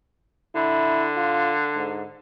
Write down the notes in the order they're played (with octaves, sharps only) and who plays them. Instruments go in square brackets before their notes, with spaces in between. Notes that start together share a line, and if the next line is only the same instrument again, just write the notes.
[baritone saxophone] D3 [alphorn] E4
[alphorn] F4
G#2